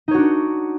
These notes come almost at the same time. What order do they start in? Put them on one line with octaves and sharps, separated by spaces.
D#4 C#5 F#4 D4